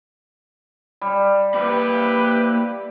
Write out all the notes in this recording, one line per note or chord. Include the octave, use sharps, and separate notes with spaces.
G3
A#3 E4 G4 B4 B5